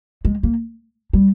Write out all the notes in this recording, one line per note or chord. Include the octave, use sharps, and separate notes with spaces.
G#3
A#3
G3